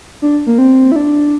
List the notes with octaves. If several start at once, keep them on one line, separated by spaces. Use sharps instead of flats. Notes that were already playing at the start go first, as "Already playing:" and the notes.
D4
A#3
C4
E4
D4